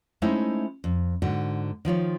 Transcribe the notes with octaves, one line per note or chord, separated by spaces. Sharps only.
G#3 A3 C#4 D#4 E4 C5
F2
G#2 D3 F#4
D#3 F3 F4 C#5